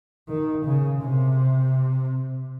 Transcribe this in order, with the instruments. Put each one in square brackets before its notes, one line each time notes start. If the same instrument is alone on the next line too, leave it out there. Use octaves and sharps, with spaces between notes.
[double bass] D#3
C#3
C3